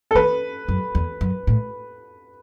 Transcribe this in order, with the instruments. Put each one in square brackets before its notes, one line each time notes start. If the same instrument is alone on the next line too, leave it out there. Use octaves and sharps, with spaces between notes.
[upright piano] A4
[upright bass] E3 [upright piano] B4
[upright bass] F#2
E2
F#2
A2